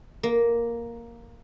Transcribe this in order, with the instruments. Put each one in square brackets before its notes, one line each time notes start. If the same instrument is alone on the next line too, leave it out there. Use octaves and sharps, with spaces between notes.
[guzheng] A#3